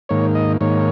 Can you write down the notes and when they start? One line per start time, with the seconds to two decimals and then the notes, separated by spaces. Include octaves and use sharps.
0.09 G#2 D#3 A#3 C#5
0.35 D#5
0.61 G#2 D#3 A#3 C#5